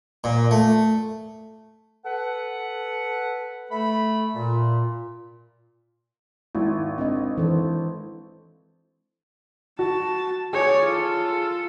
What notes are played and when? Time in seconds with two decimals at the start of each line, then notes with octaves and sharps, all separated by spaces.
0.24 A#2
0.51 A3
2.05 A4 B4 F#5
3.71 A3 B5
4.35 A#2
6.55 G#1 E4
6.98 C4 D4 D#5
7.37 E3 A4 C5
9.79 F#4 A5
10.53 G#4 C#5 D5
10.85 F4 A4